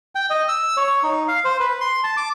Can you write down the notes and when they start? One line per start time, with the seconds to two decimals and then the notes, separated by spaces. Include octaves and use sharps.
0.15 G5
0.30 D#5
0.48 E6
0.77 C#5
1.03 D#4
1.28 F5
1.45 C5
1.60 B4
1.81 C6
2.04 A5
2.17 D6